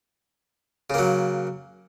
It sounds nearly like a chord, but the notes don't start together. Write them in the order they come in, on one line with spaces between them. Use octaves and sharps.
C#3 A#3 F#3